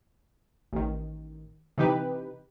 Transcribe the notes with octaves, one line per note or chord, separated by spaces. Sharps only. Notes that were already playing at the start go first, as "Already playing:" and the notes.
A1 D#3
C3 E3 D#4 G4 B4